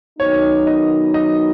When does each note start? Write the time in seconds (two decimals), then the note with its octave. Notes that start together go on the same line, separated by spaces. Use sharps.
0.19 F#2 D#3 F#3 B3 D#4 C#5
0.67 D#5
1.14 D#5